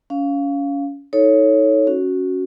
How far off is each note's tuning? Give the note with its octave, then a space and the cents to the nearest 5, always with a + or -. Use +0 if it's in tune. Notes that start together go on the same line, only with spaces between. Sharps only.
C#4 +25 F5 +0
D#4 +20 A4 +0 C#5 +0
C#4 +0 F#4 +0